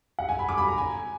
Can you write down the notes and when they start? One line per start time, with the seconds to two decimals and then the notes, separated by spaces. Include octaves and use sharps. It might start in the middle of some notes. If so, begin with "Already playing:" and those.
0.19 F#5
0.29 G#5
0.39 B5
0.49 D6
0.58 B5
0.68 A#5
0.78 G#5